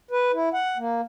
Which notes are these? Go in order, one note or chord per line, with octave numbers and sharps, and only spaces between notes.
B4
E4
F#5
A#3